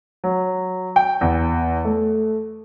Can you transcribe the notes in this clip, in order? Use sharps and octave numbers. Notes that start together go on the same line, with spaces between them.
F#3
G5
E2
A3